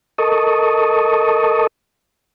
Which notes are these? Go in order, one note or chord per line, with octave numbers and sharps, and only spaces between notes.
A4 A#4 D#5 A5 C#6 D#6